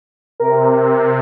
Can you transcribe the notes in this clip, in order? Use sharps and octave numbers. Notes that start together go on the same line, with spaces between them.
C3 A#4